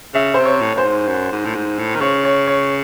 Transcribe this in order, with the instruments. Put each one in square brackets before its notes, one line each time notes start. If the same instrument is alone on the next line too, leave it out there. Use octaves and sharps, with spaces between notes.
[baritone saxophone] C#3 [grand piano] E5
[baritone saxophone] C3 [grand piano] C5
[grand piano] C#5
[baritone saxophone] A2
[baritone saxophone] F#2 [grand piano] C5
[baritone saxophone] G#2
F#2
G#2
A2
G#2
A2
D#3
[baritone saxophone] C#3 [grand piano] C#5
[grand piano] C#5
C#5